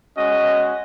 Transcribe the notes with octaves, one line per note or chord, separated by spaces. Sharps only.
G#3 C#4 F#4 D#5